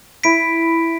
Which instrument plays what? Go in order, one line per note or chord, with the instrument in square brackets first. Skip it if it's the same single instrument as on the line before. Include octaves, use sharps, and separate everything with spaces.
[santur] E4 [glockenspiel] B6 D7